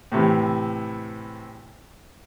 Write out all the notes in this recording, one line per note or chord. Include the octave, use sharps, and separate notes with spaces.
A2 C3 E3